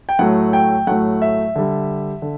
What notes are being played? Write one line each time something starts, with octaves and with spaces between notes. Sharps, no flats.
G5
A2 F#3 A3 F#5
G5
A2 F#3 A3 F#5
E5
D3 G3
D3